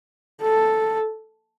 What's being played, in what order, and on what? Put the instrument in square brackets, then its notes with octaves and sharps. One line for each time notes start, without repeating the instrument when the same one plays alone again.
[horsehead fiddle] A4